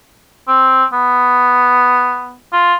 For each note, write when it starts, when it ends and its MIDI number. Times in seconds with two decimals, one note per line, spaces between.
0.48 0.85 60
0.93 2.36 59
2.53 2.74 65